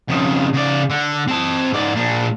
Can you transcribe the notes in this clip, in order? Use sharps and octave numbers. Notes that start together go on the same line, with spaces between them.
F2 C#3
C#3 D5
D3
C4 A5
G#2 D5
A#2 D4